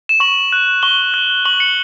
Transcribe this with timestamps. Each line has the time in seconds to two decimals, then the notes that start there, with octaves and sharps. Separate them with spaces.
0.09 E7
0.20 C#6 F#7
0.52 F#6
0.83 C#6 G7
1.14 F#6
1.45 C#6 F#7
1.60 C#7